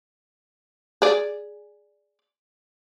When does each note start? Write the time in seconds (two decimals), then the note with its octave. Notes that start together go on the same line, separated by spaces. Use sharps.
1.02 G#4 D5